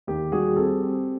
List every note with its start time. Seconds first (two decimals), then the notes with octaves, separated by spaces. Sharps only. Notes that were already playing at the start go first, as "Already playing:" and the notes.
0.07 D#2 G4
0.32 G3 F#4 G#4
0.56 C4 G4 A4
0.81 C4